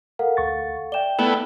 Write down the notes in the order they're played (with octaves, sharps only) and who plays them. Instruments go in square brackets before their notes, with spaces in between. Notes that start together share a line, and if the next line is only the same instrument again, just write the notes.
[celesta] A4 F5 F#5 [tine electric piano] A#4
[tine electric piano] D2 C#6 A6
[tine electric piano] D5 G5 [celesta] E5 E7 G7
[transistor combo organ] A3 B3 E4 [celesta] E7 G7